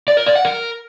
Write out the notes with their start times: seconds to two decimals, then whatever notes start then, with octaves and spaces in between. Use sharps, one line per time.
0.08 D5
0.17 A#4
0.26 D5
0.35 F#5
0.45 A#4